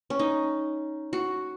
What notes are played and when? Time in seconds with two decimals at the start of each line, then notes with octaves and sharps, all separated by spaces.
0.10 C#4
0.19 D#4
1.13 F#4